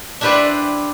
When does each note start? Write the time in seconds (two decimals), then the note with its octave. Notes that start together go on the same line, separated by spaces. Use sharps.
0.21 D4 E4 G4 B4 C5 D5